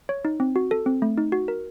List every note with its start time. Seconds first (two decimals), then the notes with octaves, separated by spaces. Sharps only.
0.09 C#5
0.25 D#4
0.40 C4
0.56 F#4
0.71 A4
0.86 C4
1.02 A3
1.18 D#4
1.32 F#4
1.48 A#4